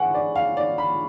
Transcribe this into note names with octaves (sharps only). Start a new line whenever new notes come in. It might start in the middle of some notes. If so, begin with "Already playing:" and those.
Already playing: C#4 G#4 B4 F#5 C#6
D5
F5
D5
B5